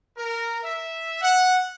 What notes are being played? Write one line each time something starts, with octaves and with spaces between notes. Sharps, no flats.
A#4
E5
F#5